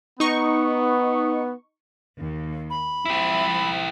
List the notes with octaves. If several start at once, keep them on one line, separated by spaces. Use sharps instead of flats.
B3 D#4 C#6
D#2
B5
F3 E4 G4 E5